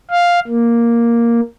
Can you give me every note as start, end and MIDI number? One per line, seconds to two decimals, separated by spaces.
0.11 0.40 77
0.48 1.41 58